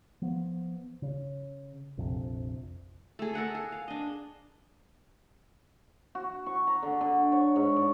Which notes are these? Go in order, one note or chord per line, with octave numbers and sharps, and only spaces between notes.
F3 B3
C#3
A#1 F2 C3 F3
A3 G#4
A4 A#4 F#5 G#5
G#4
F5
D4 D#5
F#4
C#6
A#5
D3
D3
C#5
G#2
D5